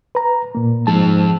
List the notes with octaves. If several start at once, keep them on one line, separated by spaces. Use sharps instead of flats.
B4 A#5
A#2 A#3
F2 G#2 F3 A5